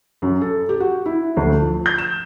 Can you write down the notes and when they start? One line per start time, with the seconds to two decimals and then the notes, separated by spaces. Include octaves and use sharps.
0.22 F#2
0.41 A4
0.69 G4
0.80 F#4
1.06 E4
1.37 D2
1.60 F3
1.86 G6
1.98 E7